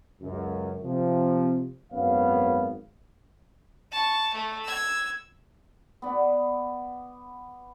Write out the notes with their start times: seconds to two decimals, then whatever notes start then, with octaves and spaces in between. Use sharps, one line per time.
0.21 C#2 F#2
0.83 C3 F3
1.92 G#1 F#2 B3 C#5 F5
3.92 A5 C#6
4.35 A3
4.65 E6 G#6
6.02 B3 D5